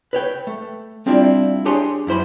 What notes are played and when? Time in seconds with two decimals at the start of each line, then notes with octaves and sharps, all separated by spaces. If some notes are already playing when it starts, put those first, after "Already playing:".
0.13 B4 C#5 G5
0.47 A3
1.06 G3 C4 D4 E4 F4 D5
1.65 D4 G4 G#4 C#5 G#5 C6
2.07 F#2 E4 C5 B5